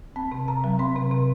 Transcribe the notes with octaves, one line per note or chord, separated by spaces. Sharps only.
C4 A5
C3
C3 A#5
F#3
C4 C6
C3
C3